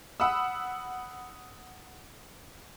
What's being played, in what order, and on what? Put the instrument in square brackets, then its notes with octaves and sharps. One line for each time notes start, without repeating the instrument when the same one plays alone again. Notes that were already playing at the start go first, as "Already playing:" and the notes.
[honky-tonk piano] F#5 B5 D#6 E6